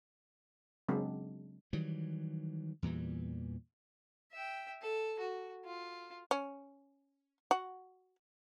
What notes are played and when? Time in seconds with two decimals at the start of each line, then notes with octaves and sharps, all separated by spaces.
0.88 C#3 F#3 G#3 C4 D4
1.73 D#3 E3 F#3 G3
2.82 E2 A#2 E3 G3
4.33 E5 G5
4.82 A4
5.19 F#4
5.65 F4
6.31 C#4
7.51 F#4